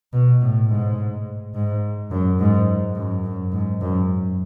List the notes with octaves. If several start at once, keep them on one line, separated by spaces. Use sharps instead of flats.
B2
A2
G#2
G#2
F#2
G#2
F#2
F#2
G#2
F#2